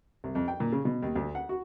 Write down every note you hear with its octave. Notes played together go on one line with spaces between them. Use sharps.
C2
F2
G5
A#2
C#3
B2
D#2
D2
F#5
F#4